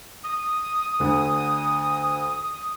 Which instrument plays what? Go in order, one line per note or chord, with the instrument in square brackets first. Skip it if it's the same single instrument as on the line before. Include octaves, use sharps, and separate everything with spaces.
[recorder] D#6
[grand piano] D2 D3